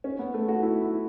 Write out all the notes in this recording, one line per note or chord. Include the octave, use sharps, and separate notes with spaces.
C#4
B3
A3
F#4
E4
E4